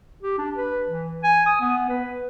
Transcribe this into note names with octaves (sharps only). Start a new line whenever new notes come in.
G4
D4
B4
E3
G#5
D#6
B3
B4